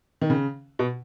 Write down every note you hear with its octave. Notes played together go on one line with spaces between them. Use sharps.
D#3
C#3
B2